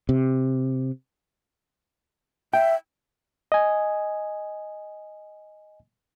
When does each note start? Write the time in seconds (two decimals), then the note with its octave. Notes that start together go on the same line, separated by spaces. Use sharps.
0.09 C3
2.53 E5 G5
3.52 D#5 G#5